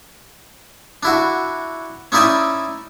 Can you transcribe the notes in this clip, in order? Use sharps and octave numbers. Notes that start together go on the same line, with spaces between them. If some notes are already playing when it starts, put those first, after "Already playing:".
D4 E4 F#4
C#4 D#4 E4 D5 E5 G#5